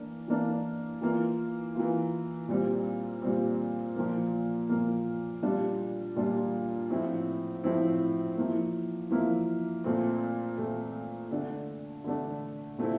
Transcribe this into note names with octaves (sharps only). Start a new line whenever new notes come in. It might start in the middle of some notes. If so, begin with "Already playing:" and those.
Already playing: E3 A#3 D4
E3 A#3 D4
E3 A#3 F4
E3 A#3 F4
A#2 G3 C4
A#2 G3 C4
A#2 F3 A#3
A#2 F3 A#3
A#2 G3 D4 F4
A#2 G3 D4 F4
A2 F3 C4 E4
A2 F3 C4 E4
F3 A#3 E4
F3 A#3 E4
A#2 A3 C4
A#2 A3 C4
D3 A3 D4
D3 A3 D4
A#2 A3 C4 E4